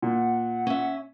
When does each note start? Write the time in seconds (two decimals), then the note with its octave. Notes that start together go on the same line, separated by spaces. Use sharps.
0.02 A#2 F#5
0.67 C#4 E5